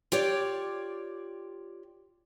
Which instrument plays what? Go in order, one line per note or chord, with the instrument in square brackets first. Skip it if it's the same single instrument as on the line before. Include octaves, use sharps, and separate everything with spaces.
[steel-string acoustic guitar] F4 G4 C#5 D5